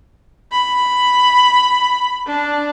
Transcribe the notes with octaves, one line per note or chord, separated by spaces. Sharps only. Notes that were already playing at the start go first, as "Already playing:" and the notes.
B5
D4